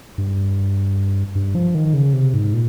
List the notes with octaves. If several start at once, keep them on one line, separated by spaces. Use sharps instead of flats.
G2
G2
F3
D#3
C#3
C3
G#2
A#2